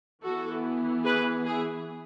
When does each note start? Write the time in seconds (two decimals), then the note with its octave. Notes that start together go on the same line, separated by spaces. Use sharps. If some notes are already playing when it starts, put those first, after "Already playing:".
0.23 E3 B3 E4 F#4 A4
1.05 G#4 B4
1.45 E4 G#4